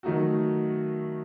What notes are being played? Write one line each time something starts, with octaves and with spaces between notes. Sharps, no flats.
D#3 F#3 A3 D#4 F#4